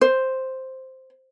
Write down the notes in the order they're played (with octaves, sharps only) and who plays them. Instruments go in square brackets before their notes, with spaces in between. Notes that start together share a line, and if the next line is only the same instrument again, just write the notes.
[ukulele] C5